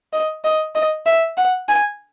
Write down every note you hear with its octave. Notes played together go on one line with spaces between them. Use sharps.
D#5
D#5
D#5
E5
F#5
G#5